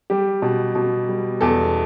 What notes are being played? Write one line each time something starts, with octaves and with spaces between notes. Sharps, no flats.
G3 G4
B2
B2
G3
E2 A4